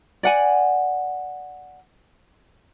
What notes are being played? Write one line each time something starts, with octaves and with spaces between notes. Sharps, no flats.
D5 F#5 G#5